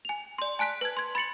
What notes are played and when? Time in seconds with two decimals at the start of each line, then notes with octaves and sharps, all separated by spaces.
0.05 G#5 F7
0.38 D5 C6
0.59 G#5 A5 F#6 B6 D7
0.81 B4 G#6
0.97 C6 G#6
1.15 B5 A6 C#7 F#7